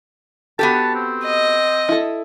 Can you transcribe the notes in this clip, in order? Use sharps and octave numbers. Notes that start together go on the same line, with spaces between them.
B3 F#4 G4 A4 A5
C4
D#5
E4 A4